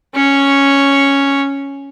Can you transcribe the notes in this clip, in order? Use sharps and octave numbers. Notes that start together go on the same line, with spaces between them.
C#4 C#5